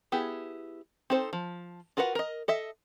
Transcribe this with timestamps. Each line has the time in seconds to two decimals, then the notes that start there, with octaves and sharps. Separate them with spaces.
0.12 B3 E4 G4 G#4
1.10 C4 D#4 A4 C5
1.33 F3
1.97 F4 F#4 A#4 B4 F#5
2.15 A#4 D#5
2.48 A4 D#5 E5